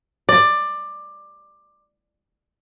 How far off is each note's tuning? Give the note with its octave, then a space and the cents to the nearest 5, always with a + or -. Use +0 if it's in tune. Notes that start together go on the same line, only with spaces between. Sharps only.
D5 +15